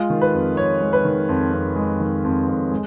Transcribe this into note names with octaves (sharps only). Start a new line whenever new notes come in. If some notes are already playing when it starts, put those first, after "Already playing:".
Already playing: G#3 F4
D#3
B4
F2
F2 C#5
G#3
B4
D#3
F2
F2
G#3
D#3
F2
F2
G#3